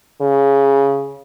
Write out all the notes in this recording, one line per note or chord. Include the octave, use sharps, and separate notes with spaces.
C#3